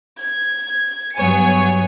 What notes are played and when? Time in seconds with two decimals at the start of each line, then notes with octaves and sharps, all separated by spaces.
0.20 G#6
1.15 G2 F#3 B3 C#5 G#5 C#7